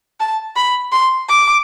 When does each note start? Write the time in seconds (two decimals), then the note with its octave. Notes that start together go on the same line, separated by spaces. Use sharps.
0.20 A5
0.56 B5
0.92 C6
1.29 D6